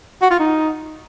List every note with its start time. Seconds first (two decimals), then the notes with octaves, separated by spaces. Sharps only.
0.22 F#4
0.31 F4
0.40 D#4